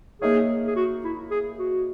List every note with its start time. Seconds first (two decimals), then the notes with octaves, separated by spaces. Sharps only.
0.21 A#3 D#4 G#4 A#4 C#5 E5
0.67 G#4
0.76 F#4
1.04 E4
1.31 G#4
1.59 F#4